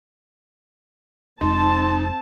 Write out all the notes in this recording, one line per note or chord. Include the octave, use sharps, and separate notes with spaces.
F1 F2 G#3 C4 D#4 A5 C6